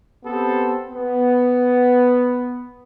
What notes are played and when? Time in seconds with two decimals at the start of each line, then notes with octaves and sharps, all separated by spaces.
0.25 B3 C4 G4 A4 C5
0.91 B3